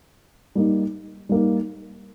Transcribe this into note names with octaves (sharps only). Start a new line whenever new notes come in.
G3 A#3 D#4
G3 A#3 D#4